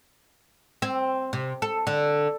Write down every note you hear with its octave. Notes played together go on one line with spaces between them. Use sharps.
C4
C3
A4
D3